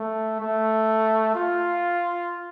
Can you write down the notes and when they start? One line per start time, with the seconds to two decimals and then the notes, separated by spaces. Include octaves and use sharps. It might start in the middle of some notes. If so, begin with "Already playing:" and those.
Already playing: A3
0.41 A3
1.35 F4